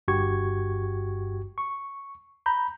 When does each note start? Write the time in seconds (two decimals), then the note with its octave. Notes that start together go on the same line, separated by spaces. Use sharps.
0.08 G1 G2 F#4 G4 C#6 G#6
1.58 C#6
2.46 A#5 B5 G6